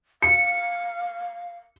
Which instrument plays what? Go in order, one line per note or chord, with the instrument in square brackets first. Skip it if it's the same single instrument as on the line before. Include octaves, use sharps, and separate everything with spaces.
[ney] F5 [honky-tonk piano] C#7